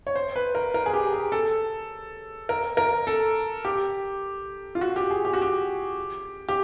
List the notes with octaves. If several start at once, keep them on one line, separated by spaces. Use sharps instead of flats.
C#5
C5
B4
A#4
A#4
G#4
G4
G#4
A4
A#4
A#4
A4
G4
F4
F#4
G4
G#4
G4
F#4
G4
G4